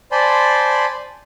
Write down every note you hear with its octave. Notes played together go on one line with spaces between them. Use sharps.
C5 D5 G#5 A5 B5 C6